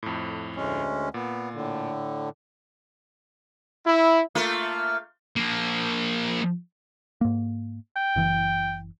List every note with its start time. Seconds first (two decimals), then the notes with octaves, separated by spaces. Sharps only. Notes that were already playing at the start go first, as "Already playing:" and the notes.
0.03 F2 A2
0.56 D2 G#3 C#4
1.14 A#2 B3
1.54 A2 D3
3.86 E4
4.35 A3 A#3 F4
5.36 F3 A#3
7.21 G#2 A#3
7.97 G5
8.16 F#1 E3